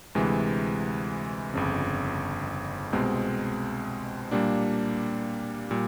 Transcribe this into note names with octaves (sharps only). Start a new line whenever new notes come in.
D2 C3 E3 G#3
G1 F2 C#3
C2 B2 G#3 C4
A#2 G3 A#3 D4
A#2 G3